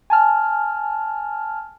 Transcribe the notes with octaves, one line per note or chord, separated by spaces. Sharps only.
G#5 A5 F6